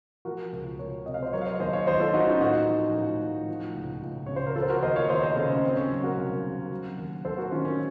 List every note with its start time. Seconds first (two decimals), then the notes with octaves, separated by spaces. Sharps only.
0.25 F3 F#4 A#4
0.52 C#2
0.79 C#2 A#4 C#5
1.06 C3 D#5
1.14 F5
1.23 C5 D#5
1.33 F#3 A#4 C#5
1.41 F5
1.46 C5 D#5
1.60 D#2 C5 D#5
1.73 C#5 F5
1.87 D#2 C5 D#5
2.00 F4 A4
2.14 D#3 D#4 F#4
2.27 C#4 F4
2.40 A2 D#4 F#4
2.68 F3
2.95 A2
3.22 F3
3.48 F3
3.75 C#2
4.02 C#2
4.26 C#3 C#5
4.36 C5
4.47 A#4
4.55 F3 F4 A4
4.63 C5
4.70 F#4 A#4
4.83 D#2 C5 D#5
4.96 C#5 F5
5.09 D#2 C5 D#5
5.23 C5 D#5
5.36 C#3 A4 C5
5.50 C#4
5.63 D#3 C4
5.77 C#4
5.90 F#3
6.03 F#4 A#4
6.17 C2
6.44 C3
6.71 F#3
6.98 D#2
7.25 D#2 A4 C5
7.38 F#4 A#4
7.51 D#3 C#4 F4
7.65 C#4